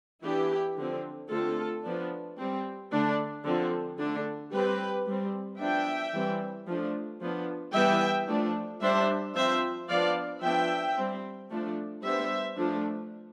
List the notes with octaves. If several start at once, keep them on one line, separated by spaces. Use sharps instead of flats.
E3 B3 D4 E4 G4
D3 F3 C4
D3 A3 C4 F4 A4
F3 B3 D4
G3 C4
D3 A3 D4
D3 F3 C4
D3 A3 D4
G3 C4 G4 B4
G3 C4
F3 B3 D4 E5 G5
E3 G3 C4
F3 A3 D4
F3 B3 D4
E3 G3 B3 E5 G5
F3 A3 D4
G3 D4 C5 E5
F3 C4 C5 E5
F3 B3 D4 D5 F5
F3 B3 D4 E5 G5
G3 C4
F3 A3 D4
G3 B3 D4 C5 E5
F3 A3 D4